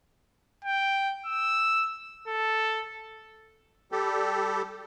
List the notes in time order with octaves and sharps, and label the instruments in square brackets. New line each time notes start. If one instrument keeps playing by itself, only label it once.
[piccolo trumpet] G5
E6
A4
[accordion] G3 G4 A4